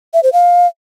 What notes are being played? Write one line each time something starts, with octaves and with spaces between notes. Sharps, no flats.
E5
C5
F5